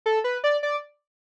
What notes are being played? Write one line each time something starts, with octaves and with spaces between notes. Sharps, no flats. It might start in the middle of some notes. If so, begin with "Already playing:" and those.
A4
B4
D5
D5